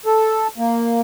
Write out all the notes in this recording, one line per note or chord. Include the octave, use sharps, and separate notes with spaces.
A4
A#3